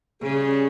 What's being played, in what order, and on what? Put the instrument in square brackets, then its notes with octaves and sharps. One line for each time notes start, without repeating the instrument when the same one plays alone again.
[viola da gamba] C#3 [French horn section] G3 C#4 G#4